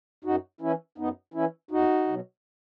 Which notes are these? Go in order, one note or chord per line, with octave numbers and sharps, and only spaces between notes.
F#2 D#4 F#4
E3 C#4 E4
F#2 B3 D#4
E3 C#4 E4
E2 D#4 F#4
B2 F#3